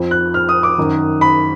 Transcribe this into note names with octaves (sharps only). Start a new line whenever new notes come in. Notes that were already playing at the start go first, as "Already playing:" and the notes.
Already playing: F2 F3
F#6
F6
D#6
D6
F#2 D#3
B5